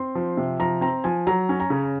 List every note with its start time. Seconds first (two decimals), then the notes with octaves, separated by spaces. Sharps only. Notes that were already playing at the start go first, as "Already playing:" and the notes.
Already playing: C4 C6
0.15 F3
0.37 C3
0.59 F3 A#5
0.81 C4 A#5
1.04 F3 G#5
1.27 F#3 A#5
1.49 C#4
1.60 A#5
1.70 C#3